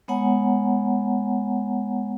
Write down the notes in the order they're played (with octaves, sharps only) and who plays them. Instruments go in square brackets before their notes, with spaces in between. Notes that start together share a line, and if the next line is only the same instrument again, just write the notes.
[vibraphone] G#3 B3 C#5 F#5 G#5 A#5